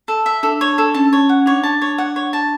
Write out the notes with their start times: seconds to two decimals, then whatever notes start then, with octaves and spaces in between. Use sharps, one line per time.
0.08 A4
0.26 E5
0.43 D4 A4
0.61 C#5
0.78 A4
0.94 C#4 A5
1.13 C#5
1.29 F#5
1.46 D4 C#5
1.63 A5
1.82 C#5
1.98 F#5
2.16 C#5
2.33 A5